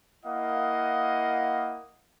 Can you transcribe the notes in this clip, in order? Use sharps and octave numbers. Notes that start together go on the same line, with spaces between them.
A#3 E4 D#5 F5 F#5